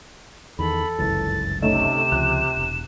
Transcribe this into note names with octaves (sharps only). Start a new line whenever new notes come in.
E2 D#3 A4 B5
G1 C#2 F#2 E3 A6
C3 A3 C#4 D#4 E7
C#2 F3 F#6
E1